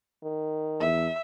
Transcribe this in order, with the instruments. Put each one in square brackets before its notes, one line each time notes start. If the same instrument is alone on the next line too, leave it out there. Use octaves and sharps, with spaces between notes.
[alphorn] D#3
[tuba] E2 [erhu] E5